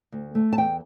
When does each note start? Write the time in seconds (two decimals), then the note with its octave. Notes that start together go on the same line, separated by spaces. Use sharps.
0.12 D2
0.35 A3
0.53 A5
0.57 E2 G5